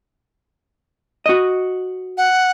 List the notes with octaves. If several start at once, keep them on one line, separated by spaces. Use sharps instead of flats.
F#4 D#5
F#5